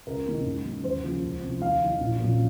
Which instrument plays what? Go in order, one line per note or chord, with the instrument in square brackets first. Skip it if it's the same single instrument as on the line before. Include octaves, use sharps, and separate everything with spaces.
[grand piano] C#2 A#4
C3 D#3 A#3 C#4
G#2
F#3 A#3 C#4
D#2 C5
C#3 F3 A#3
C#2
C3 F3
D#2 F5
D#3 F#3
A#1
A#2 F#3 A#3 C#4